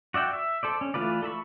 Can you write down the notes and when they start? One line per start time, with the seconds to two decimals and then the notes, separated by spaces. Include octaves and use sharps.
0.14 F#4 D5 E5 G5
0.33 E5
0.63 A4 C5 D5
0.81 C#4
0.94 E3 A3 F4 B4 D5
1.23 A4 E5 B5 C#6